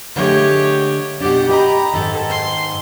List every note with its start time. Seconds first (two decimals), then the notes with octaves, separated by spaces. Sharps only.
0.16 D3 G#3 A3 G4 C#5
1.20 B2 D4 G4 F#5
1.49 G4 D#5 A#5 B5
1.93 G#2 D#3 A4
2.30 C6